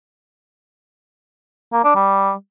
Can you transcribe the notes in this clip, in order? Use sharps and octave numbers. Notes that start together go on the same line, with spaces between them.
A#3
D4
G3